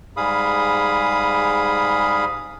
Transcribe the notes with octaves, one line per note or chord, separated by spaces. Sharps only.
G#2 G3 G#4 F5 B5 D#6